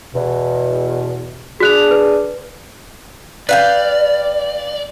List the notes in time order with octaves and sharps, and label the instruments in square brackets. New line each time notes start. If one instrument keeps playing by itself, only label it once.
[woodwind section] E2 B2
[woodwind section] D4 G#4 [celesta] F#4 F#6 F7
[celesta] B4
[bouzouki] B4 F5 G5 [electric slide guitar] D5